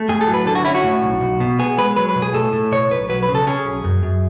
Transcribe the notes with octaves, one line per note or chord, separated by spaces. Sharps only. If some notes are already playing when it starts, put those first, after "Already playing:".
Already playing: A3
A2 G#4
A4
F#3
B4
D3 A4
F#4
C#4 E4
F#4
A2
B1
B1
B2
B3 G#4
G#3 B4
F#3 B4
B4
B2
G#4
A2 A4
A2
B2 C#5
B1 B4
F#3 B4
B4
C#3
A4
C#4 G#4
B1
F#2
F#2